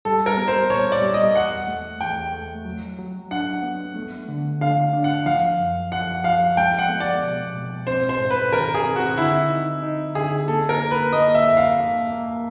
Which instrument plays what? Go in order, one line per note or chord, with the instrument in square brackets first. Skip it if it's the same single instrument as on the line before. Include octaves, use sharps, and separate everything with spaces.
[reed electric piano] G3 [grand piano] A4
[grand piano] A#4
[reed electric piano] B3
[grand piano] C5
[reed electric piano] A#2 [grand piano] C#5
[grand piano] D5
[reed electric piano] G3
[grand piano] D#5
[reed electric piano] E2 [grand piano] F#5
[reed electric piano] A3
[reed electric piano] E2 [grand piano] G5
[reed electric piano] A3
F#3
F#3
[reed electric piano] D4 [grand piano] F#5
[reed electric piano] B3
A3
D3
[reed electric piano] D3 [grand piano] F5
[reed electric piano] D4
[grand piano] F#5
[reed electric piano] F3 [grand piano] F5
[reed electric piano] F#2
[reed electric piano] F3 [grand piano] F#5
[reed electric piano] F3 [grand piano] F5
[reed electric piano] G#3 [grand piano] G5
[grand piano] F#5
[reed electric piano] B3
[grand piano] D5
[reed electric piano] B2
B2
[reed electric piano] C4 [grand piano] C5
[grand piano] C5
[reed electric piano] G#2
[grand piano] B4
[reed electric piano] D#3 [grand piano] A#4
[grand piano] G#4
[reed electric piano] C4
[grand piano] F#4
[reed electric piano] D3 [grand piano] E4
[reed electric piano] D#4
D#4
[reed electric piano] D3 [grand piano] G#4
[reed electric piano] A#3 [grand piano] A4
[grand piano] A#4
[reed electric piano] A#3
[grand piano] B4
[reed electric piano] A#3 [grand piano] D#5
[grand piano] E5
[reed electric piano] F2
[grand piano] F5
[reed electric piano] A#3
A#3